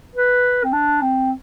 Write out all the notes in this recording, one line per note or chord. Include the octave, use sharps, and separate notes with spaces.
B4
C4
D4
C4